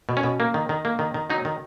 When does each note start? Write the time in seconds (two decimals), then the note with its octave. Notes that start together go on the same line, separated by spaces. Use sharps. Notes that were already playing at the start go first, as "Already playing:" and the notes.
0.09 B2
0.17 C#4
0.23 B2
0.40 A#3
0.54 D#3
0.69 D#3
0.85 A#3
0.99 D#3
1.14 D#3
1.30 F#3 D#4
1.45 D#3